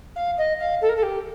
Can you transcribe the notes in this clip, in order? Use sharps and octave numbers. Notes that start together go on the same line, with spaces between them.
F5
D#5
F5
A4
A#4
A4
G4